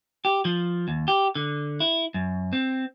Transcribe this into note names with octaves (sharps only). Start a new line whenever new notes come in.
G4
F3
D#2
G4
D3
E4
F#2
C4